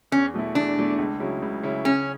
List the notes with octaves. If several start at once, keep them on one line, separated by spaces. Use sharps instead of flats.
E2 C#4
B2 A3 E4
E2 D4
B2 A3 E4
C#2
C#3 F#3 C#4 E4
C#2
C#3 F#3 C#4 E4
C#3 C#4